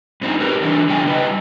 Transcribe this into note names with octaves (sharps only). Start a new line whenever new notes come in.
G#2 C4 D4 D#4
G4 A#4 B4
D3 E3 G3 D4
C#3 D4 G5 G#5
G3 B4 D#5